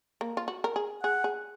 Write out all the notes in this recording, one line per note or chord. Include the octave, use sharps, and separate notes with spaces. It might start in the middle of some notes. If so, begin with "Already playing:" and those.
A#3
F4
F#4
A#4
G#4
G#4 F#5
G#4